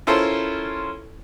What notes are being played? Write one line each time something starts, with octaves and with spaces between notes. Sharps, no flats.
C#4 E4 F4 A4 A#4 C5